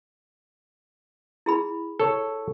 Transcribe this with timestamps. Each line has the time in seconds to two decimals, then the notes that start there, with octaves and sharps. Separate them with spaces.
1.46 E4 G#4 B5
2.00 A4 C#5